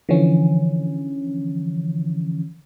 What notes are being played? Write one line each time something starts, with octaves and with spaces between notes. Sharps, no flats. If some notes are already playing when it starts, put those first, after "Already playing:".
D3 E3 F3 C#4